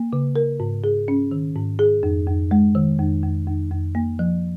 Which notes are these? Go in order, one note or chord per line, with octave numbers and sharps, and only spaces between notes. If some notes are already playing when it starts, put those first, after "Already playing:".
Already playing: A#3
C#3
A#4
G#2
G#4
C#4
D#3
G#2
G#4
F2
F2
G#3
D#3
F2
F2
F2
F2
A#3
F3